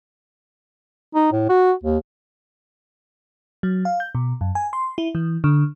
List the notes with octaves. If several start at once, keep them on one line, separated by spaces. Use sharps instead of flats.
D#4
A2
F#4
D#2
F#3
F5
G6
B2
F#2
G#5
C6
E4
E3
D3